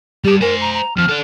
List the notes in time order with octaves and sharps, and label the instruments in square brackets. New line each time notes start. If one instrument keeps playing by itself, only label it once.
[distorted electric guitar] G3 A5 [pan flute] G4
[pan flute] A#4 [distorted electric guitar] C5 G#5
[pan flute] A#5
A#5
[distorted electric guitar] F2 [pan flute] F6
[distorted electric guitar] A4 D5